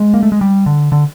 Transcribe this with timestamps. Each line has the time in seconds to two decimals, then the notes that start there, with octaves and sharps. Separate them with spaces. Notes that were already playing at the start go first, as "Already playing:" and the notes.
Already playing: G#3
0.14 A#3
0.23 A3
0.32 G#3
0.41 G3
0.66 D3
0.92 D3